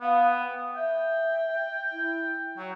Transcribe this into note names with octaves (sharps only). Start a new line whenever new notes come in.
B3 F5
G5
E5 G5
E4
F#3 G5